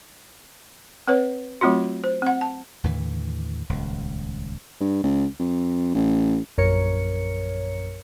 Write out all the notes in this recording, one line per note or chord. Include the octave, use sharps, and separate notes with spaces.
C4 B4 C#5
F#3 A3 C4 F4 F#4
C5
C4 F#5
A5
D#2 A2 D3 E3
D#1 C#2
G2
C#2
F2
A1
A#1 F#2 A#4 C#5 C#7